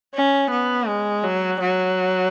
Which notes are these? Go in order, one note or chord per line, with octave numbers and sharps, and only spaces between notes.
C#4
B3
G#3
F#3
F#3